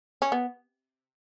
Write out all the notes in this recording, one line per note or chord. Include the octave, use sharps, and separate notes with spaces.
C#4
B3